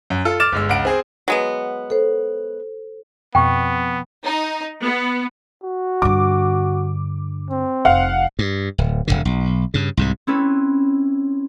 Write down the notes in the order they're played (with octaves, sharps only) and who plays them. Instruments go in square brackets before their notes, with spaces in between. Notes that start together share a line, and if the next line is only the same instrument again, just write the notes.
[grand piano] F#2
F4 A4
D6 F6 A6 E7
G1 G#3 E6
C#2 F#5 D7
C4 G#4 C5
[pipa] F#3 G#3 B3
[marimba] A4 C5
[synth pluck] F2 B2 [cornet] B3 [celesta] G5 C#6
[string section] D#4
B3
[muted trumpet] F#4
[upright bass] G2 D3 [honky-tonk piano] D6
[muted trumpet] C4
[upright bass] F1 [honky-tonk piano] F5 F#5
[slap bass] G2
D1
E1 A#1 D3
B1
G2 C#3
C2 G#2 C3
[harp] C4 C#4 E4 A4 B4